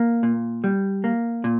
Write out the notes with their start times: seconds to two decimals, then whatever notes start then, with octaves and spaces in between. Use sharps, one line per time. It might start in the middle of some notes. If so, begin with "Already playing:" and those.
Already playing: A#3
0.23 A#2
0.64 G3
1.04 A#3
1.44 A#2